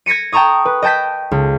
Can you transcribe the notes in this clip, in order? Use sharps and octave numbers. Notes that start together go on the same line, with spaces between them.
G#6 A#6 B6 C#7 D#7
G5 A5 A#5 C#6 D#6
B4
D#5 G5 A5 G6 B6
C#2